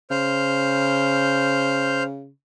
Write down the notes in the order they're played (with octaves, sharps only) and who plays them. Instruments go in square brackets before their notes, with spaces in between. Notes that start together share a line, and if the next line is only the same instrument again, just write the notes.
[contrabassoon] C#3 [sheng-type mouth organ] C5 F6 G6